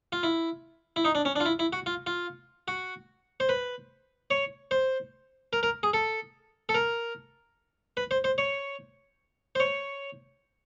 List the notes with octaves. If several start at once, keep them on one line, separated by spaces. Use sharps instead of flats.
F4
E4
E4
D#4
D4
C#4
D4
F4
E4
E4
F#4
F4
F4
F#4
C5
B4
C#5
C5
A#4
A#4
G#4
A4
A4
A#4
B4
C5
C5
C#5
C5
C#5